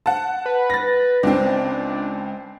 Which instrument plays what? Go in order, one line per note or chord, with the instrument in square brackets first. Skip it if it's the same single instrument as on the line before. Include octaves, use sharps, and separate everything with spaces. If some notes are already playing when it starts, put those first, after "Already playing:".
[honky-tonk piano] F#5 A5
[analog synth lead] B4
[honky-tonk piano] A6 A#6
[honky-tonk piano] C#2 C4 [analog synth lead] D4